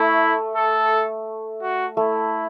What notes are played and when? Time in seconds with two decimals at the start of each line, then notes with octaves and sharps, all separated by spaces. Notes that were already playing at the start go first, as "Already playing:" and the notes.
Already playing: A3 E4
0.56 A4
1.61 F#4
1.97 A3 E4